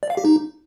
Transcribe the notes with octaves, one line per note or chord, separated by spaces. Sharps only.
D5
F5
G4
D#4